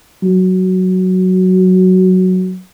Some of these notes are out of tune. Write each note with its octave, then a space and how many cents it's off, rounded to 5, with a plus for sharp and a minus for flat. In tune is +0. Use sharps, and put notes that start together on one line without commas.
F#3 +5